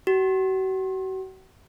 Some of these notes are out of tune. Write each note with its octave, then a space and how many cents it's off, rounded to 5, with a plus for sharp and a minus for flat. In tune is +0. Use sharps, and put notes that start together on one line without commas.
F#4 +40